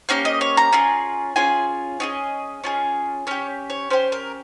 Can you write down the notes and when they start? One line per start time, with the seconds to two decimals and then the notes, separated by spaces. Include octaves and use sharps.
0.09 A#3 C#4 G4 F5
0.25 D#5
0.41 C#5
0.57 A#5
0.73 C#4 F4 G#4
1.36 C#4 F4 G#4 G#5
2.00 C#4 F4 G#4 D#5
2.64 C#4 F4 G#4
3.27 C#4 G4 C#5
3.70 C#5
3.90 C#4 G4 C5
4.12 A#4